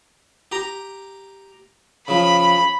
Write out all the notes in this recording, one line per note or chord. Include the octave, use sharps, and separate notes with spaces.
G4 A#5
C#3 F3 B5